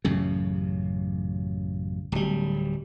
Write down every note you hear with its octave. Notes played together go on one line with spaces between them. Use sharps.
A1 F#2 C#3
D1 G3